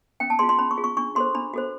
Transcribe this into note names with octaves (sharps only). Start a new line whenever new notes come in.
C#4 G5
A5
F4 G#4 C6
C6
C#4 B5
C#6
F4 G#4
C#6
D4 C#6
F#4 A4 C5 C6
D4 B5
F#4 A4 C5